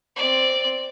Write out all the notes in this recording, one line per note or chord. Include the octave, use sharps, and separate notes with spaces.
C4 D5